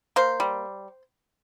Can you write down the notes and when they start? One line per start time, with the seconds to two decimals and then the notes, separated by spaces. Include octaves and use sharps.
0.16 A#3 C5
0.40 G3